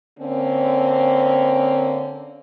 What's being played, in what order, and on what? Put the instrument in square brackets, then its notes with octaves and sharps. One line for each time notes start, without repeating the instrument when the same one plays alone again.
[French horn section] D3 A#3 C4 C#4